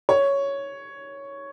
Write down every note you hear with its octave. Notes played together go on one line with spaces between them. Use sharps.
C#5